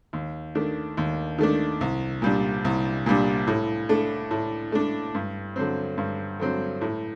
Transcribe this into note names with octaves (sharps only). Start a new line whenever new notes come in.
D#2
D#3 A3 D4
D#2
D#3 A3 D4
C2
A#2 G3 D4
C2
A#2 G3 D4
A2
A3 D4
A2
A3 D4
G2
D3 F#3 C4
G2
D3 F#3 C4
A2